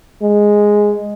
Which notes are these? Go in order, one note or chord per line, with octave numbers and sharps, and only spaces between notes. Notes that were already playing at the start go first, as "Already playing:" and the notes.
G#3